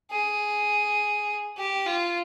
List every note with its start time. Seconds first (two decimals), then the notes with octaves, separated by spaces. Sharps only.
0.11 G#4
1.57 G4
1.86 F4